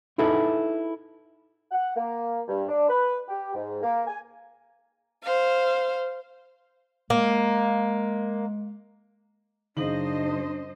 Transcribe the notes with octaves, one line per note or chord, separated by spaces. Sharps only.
D#4 E4 G#4 A4 B4
F#5
A#3
G2
D4
B4
G4
G#2
A#3
G#5
C5 F5
G#3 A#3
F#2 C#3 D4 D#4 C5 D#5 F#7